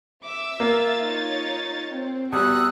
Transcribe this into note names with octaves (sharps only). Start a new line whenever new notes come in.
E5 D6 E6
A#3 F4 A6
D#4 C#5
C4
E2 G3 F#4 F#5 D#6 E6 F#6